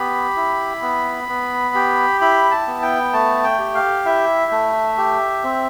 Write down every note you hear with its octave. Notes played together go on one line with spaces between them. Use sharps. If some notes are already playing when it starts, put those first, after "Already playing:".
Already playing: B3 G4 B5
E4
B3
B3
G4
E4 B5
A5
B3
G5
A3 A5
G5
G4
F5
E4 E5
A3
G4
C4